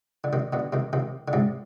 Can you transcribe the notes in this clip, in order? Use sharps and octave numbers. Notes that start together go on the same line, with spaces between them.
D3
C3 D#3
B2 D3
C3 D#3
C3 D#3
D3
G#2 C3